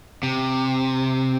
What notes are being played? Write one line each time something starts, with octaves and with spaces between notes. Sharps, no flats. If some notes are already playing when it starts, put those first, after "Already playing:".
C3